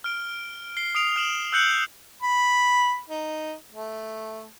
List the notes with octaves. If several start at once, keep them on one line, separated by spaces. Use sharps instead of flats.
F6 D7 G7
C7 G7
D#6 C7 D7 F7
F6 E7 F#7
E6 F#6 G6 C#7 F#7
B5
D#4
A3